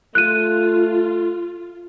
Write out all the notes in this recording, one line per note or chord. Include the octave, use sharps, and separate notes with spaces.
A3 F4 F#6 D#7